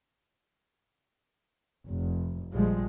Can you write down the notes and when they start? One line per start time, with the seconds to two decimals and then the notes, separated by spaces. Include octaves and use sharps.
1.87 F1
2.53 A#1 F3 G3 G#3